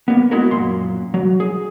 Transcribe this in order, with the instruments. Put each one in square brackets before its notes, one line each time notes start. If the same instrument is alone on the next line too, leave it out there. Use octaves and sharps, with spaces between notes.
[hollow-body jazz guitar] A#3 B3
G#3 B3 E4 F#4 A#4
F#2 A#2 C6
F#3
G#4